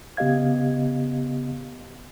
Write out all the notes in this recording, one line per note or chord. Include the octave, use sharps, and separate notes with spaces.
C#3 B3 G4 D#5 F5 G#6